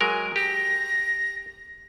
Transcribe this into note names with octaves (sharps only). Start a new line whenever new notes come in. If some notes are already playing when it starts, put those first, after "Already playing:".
F#3 G#3 A#4 G#5
G4 A#6